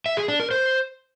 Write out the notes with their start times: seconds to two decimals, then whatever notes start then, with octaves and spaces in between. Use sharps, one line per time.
0.06 E5
0.17 G#4
0.28 D4
0.40 A#4
0.51 C5